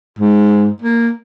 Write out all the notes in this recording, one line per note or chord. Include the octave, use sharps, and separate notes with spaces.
G#2
A#3